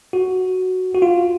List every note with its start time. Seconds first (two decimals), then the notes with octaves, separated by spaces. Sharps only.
0.13 F#4
0.94 F#4
1.02 F4